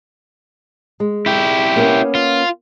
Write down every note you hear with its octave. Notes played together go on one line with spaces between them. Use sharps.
G#3
E4 G4
A#3 B3 C#4
F4